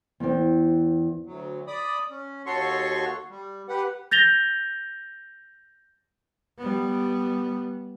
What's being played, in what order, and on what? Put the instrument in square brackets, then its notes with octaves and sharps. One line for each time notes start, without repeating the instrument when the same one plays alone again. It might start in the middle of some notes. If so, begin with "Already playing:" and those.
[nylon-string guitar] E2 C4
[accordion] D2 F#3
D5 B5 D#6
C#4
D#2 F#4 A4 C#5 C6 C#6
G3
G4 B4 F#5
[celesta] G6 A6 A#6 F7 G7
[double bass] G3 B3